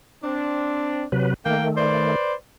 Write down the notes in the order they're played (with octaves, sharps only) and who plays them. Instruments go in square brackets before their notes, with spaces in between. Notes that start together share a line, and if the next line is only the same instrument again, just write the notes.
[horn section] C4 D4
[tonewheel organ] C3 F#3 B4
[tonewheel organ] D#3 A3 [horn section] A#3 G5
[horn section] B4 C5 D5